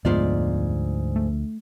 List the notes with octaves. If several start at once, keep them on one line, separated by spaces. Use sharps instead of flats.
F1 D2 G#2 F3 B3 F4 D5
A3